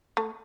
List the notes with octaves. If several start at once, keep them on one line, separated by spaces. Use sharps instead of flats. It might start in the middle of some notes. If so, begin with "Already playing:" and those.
A3